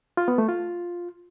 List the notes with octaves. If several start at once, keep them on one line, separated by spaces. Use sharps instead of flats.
F4
B3
A3
F4